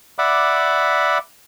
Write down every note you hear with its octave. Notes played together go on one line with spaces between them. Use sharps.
D5 E5 F#5 B5 D6